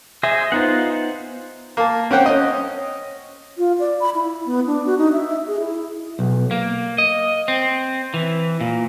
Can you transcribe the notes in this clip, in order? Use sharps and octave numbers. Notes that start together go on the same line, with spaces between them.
G#4 C5 D#5 E5
B3 D#4 F4 C5 F#5
A#3 A5
C4 C#4 F#5 G5
C#4 D#5
F4
D5
B5
E4
B3
D4
F#4
D#4
E5
G#4
E4
B1
A#3
D#5
C4
E3
A#2